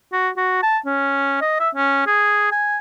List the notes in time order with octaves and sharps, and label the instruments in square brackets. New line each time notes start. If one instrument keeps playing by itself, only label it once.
[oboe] F#4
F#4
A5
C#4
D#5
E5
C#4
G#4
G#5